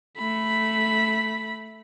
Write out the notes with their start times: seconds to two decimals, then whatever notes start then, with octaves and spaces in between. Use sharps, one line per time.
0.18 A3 B5